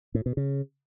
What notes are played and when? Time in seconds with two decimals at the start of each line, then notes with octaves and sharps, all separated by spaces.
0.15 A2
0.26 B2
0.37 C#3